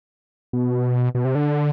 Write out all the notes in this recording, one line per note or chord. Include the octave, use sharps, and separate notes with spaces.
B2
B2
C3
D3